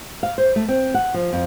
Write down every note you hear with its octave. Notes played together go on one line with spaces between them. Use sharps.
F5
C5
A3
C4
F#5
F3
F2